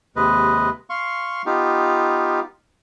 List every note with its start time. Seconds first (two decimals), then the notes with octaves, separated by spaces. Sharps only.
0.16 D#2 C3 G#3 B4 D#5
0.90 F5 C6 C#6
1.46 B3 D#4 F4 G4